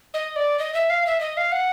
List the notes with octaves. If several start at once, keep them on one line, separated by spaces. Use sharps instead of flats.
D#5
D5
D#5
E5
F5
E5
D#5
F5
F#5